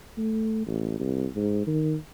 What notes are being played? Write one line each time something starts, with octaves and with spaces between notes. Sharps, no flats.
A3
A1
C2
G#2
D#3